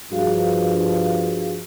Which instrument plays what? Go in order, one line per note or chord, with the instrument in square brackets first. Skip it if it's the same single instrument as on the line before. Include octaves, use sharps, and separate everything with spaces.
[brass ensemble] G2 F3 [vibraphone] F#4 G#4 F5